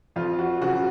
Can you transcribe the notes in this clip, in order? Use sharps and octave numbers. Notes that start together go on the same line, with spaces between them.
F2 F4
F#4
C#3 F#3 F#4